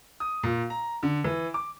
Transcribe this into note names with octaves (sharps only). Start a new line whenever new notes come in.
D#6
A#2
A#5
D3
E3
D6